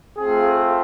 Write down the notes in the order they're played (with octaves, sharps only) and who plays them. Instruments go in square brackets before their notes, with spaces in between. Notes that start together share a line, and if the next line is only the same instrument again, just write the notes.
[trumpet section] A3 C4 F4 G#4